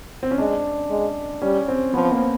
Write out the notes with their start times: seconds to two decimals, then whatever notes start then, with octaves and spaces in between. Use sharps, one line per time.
0.23 C4
0.31 C#4
0.38 G#3 D4
0.90 G#3
1.42 G3 C#4
1.68 C4
1.94 F3 B3
2.12 A#3